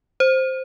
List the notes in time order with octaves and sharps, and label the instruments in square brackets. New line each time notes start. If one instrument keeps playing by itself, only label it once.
[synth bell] C5